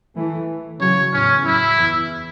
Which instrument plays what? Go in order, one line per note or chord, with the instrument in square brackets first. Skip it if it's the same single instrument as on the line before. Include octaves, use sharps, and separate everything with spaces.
[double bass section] E3 A3
[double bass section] C#3 F#3 [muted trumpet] C#5
[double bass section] E2 A2 [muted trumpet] C#4
[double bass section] F#2 [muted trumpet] E4
[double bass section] E2